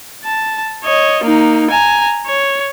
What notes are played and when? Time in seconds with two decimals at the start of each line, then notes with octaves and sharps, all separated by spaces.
0.25 A5
0.84 C#5 D#5
1.24 A#3 D#4
1.71 G#5 A#5
2.26 C#5